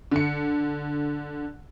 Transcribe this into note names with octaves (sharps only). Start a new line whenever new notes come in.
D3 C#7